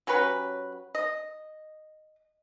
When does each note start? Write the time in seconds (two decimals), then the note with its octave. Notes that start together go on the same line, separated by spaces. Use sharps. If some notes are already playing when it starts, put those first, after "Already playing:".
0.07 F#3 C#4 G4 B4
0.95 D#5